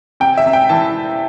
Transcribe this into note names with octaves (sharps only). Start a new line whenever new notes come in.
C3 G5
E5
C3
G5
E3 A5